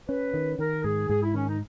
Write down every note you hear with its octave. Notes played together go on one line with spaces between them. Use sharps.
C#4 B4
D#3
D#3 A#4
G#2 G#4
G#2 G#4
E4
D#3 C#4
D#4